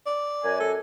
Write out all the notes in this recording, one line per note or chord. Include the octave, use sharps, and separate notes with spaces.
D5
F#2 G#5
A4